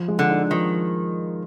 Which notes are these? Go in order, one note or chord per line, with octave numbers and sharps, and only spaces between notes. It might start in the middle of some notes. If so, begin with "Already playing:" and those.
Already playing: F3
G#3
D3
D#4
D#3 F3